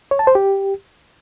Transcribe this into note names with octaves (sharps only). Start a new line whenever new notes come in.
C#5
A5
C5
G4